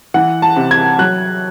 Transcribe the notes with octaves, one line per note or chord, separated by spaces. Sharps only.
E3 F#5
A5
C3
G#6
F#3 F#6